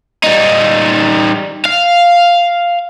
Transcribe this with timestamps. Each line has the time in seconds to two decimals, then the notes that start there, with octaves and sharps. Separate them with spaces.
0.24 G3 D#4
1.65 F5